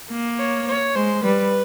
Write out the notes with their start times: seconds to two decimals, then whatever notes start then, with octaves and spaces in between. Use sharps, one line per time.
0.11 A#3
0.39 C#5
0.68 C#5
0.95 G#3 C5
1.24 G3 B4